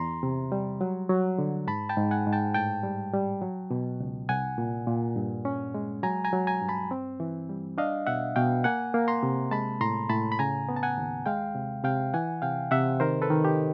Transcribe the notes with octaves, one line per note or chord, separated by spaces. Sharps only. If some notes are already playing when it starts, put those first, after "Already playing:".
Already playing: E2 A#5 C6
C3
G3
F#3
F#3
D3
G#2 A5 B5
G5 A5
G#2
F#5 G#5
G#2
G5 A5
A2 G5 A5
G3
G3
F#3
B2
C#2
C2 F#5 G#5
A#2
A#2
G2
C#4
G#3
F#3 G#5 A#5
G#5 A#5
F#3
G#5 A#5
G2
A5 B5
C4
E3
G3
D4 D#5 F5
B2 E5 F#5
B2 F5 G5
A#3 F#5 G#5
A#3
A#5 C6
C3
G#3 A5 B5
A2 A#5 C6
A2 A5 B5
B5
C#3 G#5 A#5
B3
A5
F#5 G#5
D#2
G#3 F5 G5
C3
C3 F5 G5
E3 F#5 G#5
C3 F5 G5
C3 E5 F#5
D#3 A#4 C5
A4 B4
D#3
G4